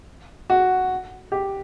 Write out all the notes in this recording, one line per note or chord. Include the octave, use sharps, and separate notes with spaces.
F#4
G4